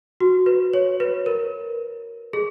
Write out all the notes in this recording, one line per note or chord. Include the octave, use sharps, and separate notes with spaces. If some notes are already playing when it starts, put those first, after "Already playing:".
F#4
B4
C#5
B4
A#4
G#4